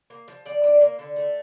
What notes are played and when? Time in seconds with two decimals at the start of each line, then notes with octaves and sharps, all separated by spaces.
0.10 A#3
0.28 F3
0.46 F3 D5
0.64 D4
0.81 A#3
0.99 D3
1.16 A3